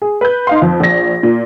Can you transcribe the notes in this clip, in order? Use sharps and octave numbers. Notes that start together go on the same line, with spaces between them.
G#4
B4 G6
D#4 F5 C6
F2
A#1 A#6
A#2